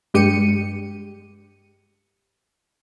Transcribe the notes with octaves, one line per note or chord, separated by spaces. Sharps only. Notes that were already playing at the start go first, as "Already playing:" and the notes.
G2 G#3 G4 C#7 D#7